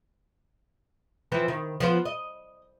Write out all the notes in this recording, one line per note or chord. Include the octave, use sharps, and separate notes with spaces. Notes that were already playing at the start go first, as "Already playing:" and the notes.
E3 F3 C4
D#3
F3 B3 C5
D#5